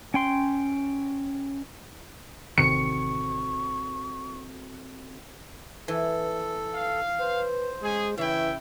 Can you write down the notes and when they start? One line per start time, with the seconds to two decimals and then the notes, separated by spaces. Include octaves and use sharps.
0.14 C#4 G5 C6
2.58 A1 C3 D#3 C4 F#4 A4 C#6 C#7
5.88 E3 A4
6.74 F5
7.19 B4 C5
7.82 G#3 C#4 G#4
8.18 C#3 E3 E4 C#5 E5 G5